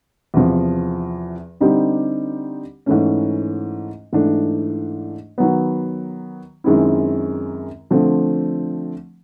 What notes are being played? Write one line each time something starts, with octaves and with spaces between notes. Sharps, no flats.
E2 C3 F3
D3 G3 C4 D#4 G4
G#2 E3 A3 C#4
G#2 E3 A3 D4
D#3 F#3 B3
F#2 D#3 G#3 C4 E4
D3 F3 A3 C4